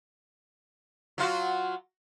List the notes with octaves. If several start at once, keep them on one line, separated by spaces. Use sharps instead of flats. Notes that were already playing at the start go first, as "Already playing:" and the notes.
F#3 F4 F#4